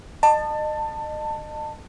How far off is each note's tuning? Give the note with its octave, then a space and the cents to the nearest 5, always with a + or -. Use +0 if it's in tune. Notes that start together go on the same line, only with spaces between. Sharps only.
D#5 -30 A5 +20